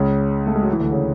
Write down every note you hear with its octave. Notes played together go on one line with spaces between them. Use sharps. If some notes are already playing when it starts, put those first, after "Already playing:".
Already playing: C#2 C#3
A3
G#3
F#3
E3
D2 D3
C#3